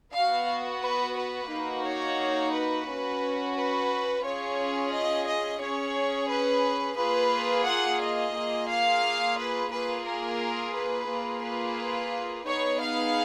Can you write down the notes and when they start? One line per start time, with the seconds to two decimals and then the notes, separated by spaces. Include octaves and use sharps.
0.14 B3 F#4 F5
0.82 B4
1.17 B4
1.50 A#3 D#4 F#4
1.85 C#5
2.53 B4
2.87 C#4 F#4
3.56 B4
4.24 C#4 F4 G#4 C#5
4.93 D#5
5.27 D#5
5.61 C#4 G#4 C#5
6.30 B4
6.98 A#3 F4 G#4 B4
7.66 F#5
8.01 D#5
8.35 A#3 F4 G#4
8.69 F5
9.38 B4
9.72 A#3 F4 G#4 B4
10.06 A#4
10.75 B4
11.09 A#3 F4 G#4
11.43 B4
12.46 B3 D#4 G#4 C#5
12.80 F5